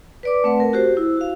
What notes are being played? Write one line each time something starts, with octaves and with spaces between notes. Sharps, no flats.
B4 D5 D6
A3 C4 B4 F#5
A#4
F#4 G4 C5
E4
F#4 F5